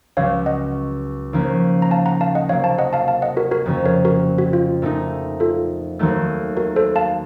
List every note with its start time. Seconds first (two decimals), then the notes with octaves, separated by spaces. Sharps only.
0.17 C#2 C#3 F#3 C#5 F5
0.46 D#5 F#5
1.33 D#2 C#3 F3 A#3 C#4
1.82 A#5
1.91 F5 A5
2.06 F#5 A#5
2.21 F5 A5
2.35 D#5 F#5
2.49 C3 F#3 A#3 C#5 F5
2.64 F5 A5
2.79 D#5 F#5
2.93 F5 A5
3.08 F5 A5
3.22 D#5 F#5
3.37 F#4 A#4
3.51 F#4 A#4
3.66 F2 C#3 F#3 A#3 C#4
3.85 A#4 C#5
4.05 F#4 A#4
4.38 F#4
4.53 F4
4.82 A#2 A3 D#4
5.40 F4 A4
5.99 D#2 D#3 F#3 A3
6.57 F#4 A#4
6.76 A4 C5
6.96 F5 A5